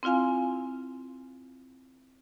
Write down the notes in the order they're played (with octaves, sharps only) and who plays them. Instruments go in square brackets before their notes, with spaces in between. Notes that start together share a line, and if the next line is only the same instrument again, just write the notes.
[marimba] C4 E4 F4 F5 G#5